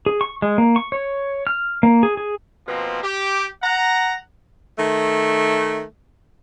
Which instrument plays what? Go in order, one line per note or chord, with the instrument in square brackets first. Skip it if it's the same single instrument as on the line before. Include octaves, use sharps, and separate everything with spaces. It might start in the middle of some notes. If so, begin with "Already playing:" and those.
[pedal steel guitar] G#4
C#6
G#3
A#3
C#6
C#5
F6
A#3
G#4
G#4
[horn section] B2 F3 A#3 C4
G4
F#5 A#5
[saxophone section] D#3 A3